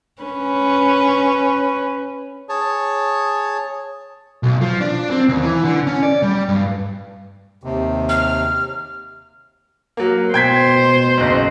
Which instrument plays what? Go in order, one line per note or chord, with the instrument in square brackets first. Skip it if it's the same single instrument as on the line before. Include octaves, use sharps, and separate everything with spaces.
[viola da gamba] C#4 B4
[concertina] G#4 C#5 A5
[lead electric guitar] B1
F3
D4
C4
D#2
E3
D3
C#4
D5
G3
G2
[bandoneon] D#2 C3
[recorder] F6
[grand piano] F#3 A#3
[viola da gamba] B2 C5 [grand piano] G5 G#6 B6
[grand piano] F#1 B1